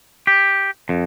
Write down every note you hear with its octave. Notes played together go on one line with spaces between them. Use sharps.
G4
F2